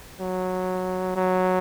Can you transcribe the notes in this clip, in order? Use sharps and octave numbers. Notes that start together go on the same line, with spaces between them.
F#3
F#3